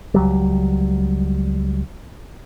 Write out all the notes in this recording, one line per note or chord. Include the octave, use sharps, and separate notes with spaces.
C#2 F#3 G3